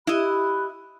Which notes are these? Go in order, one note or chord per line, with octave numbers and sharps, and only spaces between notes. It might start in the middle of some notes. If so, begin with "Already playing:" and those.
E4 G4 D#5 B5 F#6